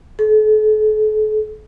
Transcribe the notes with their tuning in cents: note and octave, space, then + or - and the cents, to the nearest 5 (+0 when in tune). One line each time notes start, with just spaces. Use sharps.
A4 -40